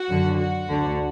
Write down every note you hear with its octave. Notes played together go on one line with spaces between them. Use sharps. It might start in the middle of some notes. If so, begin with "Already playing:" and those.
Already playing: F#4
F#2 D3
F#4
D2 D3